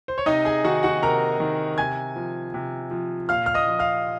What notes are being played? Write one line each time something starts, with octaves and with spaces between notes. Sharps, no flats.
C5
C#5
C3 D#4 D#5
G#4 G#5
D#3 F#4 F#5
F#4 F#5
C3 A#4 A#5
D#3
C3 G#5 G#6
F3
C3
F3
A#2 F5 F6
F6
D#5 D#6
F3
F5 F6